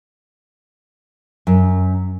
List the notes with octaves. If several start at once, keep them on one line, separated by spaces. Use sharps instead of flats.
F#2